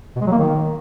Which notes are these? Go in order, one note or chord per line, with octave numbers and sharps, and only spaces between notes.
B2
G#3
F#3
A#3
D#3